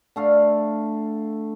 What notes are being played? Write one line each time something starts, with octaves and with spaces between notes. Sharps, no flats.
D3 A3 F5